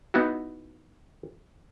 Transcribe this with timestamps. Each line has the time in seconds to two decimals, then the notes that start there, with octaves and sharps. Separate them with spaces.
0.14 B3 D#4 E4 F#4